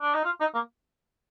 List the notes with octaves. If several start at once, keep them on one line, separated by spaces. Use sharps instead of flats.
D4
D#4
F4
D#4
A#3